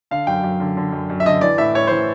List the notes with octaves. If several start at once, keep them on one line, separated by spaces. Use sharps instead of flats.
D3 F5
F#2 G5
F#2
D3
D3
F#2
F#2
E5
D3 D#5
E3 D5
A2 E5
A2 C#5
E3 C5